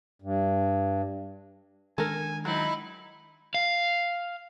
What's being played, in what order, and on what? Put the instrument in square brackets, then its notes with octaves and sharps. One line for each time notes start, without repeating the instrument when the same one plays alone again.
[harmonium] G2
[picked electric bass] D#3 G#3 D4 [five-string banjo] A4 A#4 [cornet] G#5
[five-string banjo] F#3 [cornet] C4 [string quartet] D#4 E4
[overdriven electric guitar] F5